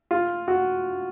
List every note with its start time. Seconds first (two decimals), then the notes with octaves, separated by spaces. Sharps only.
0.11 F4
0.48 F#4